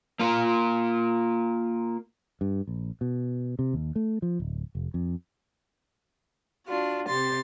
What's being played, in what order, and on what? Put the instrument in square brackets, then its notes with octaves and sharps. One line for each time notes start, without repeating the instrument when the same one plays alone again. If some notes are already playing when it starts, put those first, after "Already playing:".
[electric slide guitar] A#3 F4 A#4
[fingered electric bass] G2
A#1
B2
C3
D#2
A3
F3
D1
F1
F2
[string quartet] D4 F4 F#4
C3 G4 C6 A6